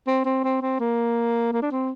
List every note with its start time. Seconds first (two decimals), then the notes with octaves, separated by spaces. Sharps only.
0.07 C4
0.25 C4
0.44 C4
0.61 C4
0.80 A#3
1.53 A#3
1.62 D4
1.72 C4